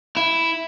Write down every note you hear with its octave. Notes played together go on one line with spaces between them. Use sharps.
E4